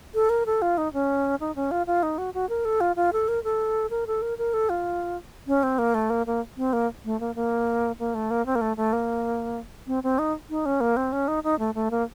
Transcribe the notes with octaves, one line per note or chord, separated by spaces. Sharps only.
A4
A#4
A4
F4
D#4
C#4
D#4
C#4
F4
F4
D#4
F#4
F#4
A#4
A4
F4
F4
A4
A#4
A4
A#4
A4
A#4
A#4
A4
F4
C#4
C4
A#3
A3
A#3
A#3
C4
A#3
A3
A#3
A#3
A#3
A3
A#3
C4
A#3
A3
A3
A#3
C4
C4
D#4
D#4
C#4
A#3
C4
C#4
D#4
D#4
A3
A3
A#3